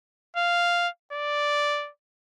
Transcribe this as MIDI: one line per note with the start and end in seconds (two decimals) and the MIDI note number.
0.36 0.88 77
1.13 1.90 74